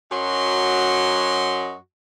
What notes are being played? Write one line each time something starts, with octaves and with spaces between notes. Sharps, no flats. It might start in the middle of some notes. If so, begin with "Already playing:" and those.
F#2 F#3 F#4 D#5 C6